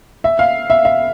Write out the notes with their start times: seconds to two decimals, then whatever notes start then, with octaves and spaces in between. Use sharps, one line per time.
0.24 E5
0.39 F5
0.70 E5
0.85 E5